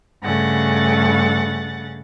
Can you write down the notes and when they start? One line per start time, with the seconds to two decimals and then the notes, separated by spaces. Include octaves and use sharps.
0.23 G2 C#3 A3 F#5 A6